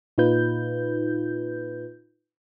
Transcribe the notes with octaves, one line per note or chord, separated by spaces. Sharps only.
A#2 D#4 F4 B4 G6